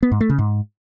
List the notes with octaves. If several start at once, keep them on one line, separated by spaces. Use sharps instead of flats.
B3
G#2
A3
C#3
G#2